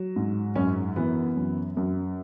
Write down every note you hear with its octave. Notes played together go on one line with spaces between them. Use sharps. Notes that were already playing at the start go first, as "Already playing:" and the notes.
Already playing: F#3
G#2
F#2 C#4
E3 B3
F#2
F#2